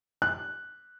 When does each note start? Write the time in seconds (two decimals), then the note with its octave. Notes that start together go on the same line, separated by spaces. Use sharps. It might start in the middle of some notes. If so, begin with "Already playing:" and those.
0.22 F#6